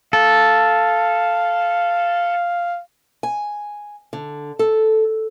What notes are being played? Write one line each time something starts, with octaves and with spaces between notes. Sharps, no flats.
A4 F5
G#5
D3
A4